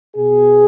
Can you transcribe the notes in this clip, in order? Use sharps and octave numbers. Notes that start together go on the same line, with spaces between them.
B2 G#4